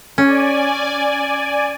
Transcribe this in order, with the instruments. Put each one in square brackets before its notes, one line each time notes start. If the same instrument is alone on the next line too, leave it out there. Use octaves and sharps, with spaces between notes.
[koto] C#4 [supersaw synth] D5 G#5